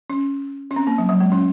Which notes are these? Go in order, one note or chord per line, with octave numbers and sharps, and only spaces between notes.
C#4
C#4
C4
A#3
F#3
F#3
G#3
C#4